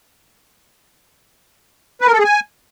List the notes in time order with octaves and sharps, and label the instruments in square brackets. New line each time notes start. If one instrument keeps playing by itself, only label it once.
[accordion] B4
A#4
A4
G#4
G#5